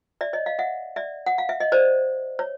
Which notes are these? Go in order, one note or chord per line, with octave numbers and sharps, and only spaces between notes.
D5 E5
C#5 D#5
D#5 F5
E5 F#5
D5 E5
F#5
F5
E5
D#5
C5 D5
C#5